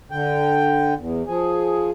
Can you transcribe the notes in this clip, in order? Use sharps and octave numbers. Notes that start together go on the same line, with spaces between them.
D3 G5
E2
F3 G#4